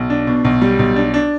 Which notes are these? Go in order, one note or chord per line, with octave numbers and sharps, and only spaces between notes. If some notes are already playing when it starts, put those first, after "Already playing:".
Already playing: B1
D4
B2
B1
G3
B1
D4
D4